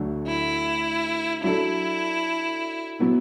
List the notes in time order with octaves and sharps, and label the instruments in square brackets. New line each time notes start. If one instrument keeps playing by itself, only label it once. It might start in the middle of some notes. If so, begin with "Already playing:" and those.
Already playing: [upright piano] D2 D3 F#3 A3
[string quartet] E4
[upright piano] F#3 D4 A4 [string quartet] E4
[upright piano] B2 F#3 B3 E4